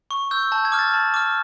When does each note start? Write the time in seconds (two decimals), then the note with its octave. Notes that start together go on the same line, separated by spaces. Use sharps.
0.11 C#6
0.31 E6 G6
0.52 A5 G6
0.65 G#6
0.72 D6 F6
0.79 A6
0.94 A5
1.14 D6 F6